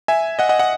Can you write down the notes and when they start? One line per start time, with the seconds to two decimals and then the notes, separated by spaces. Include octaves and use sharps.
0.08 E5 G#5
0.39 D#5 F#5
0.49 D#5 F#5
0.59 D#5 F#5